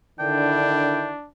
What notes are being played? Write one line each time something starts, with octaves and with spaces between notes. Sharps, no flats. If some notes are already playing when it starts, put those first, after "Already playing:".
D3 D#3 D4 E4 G5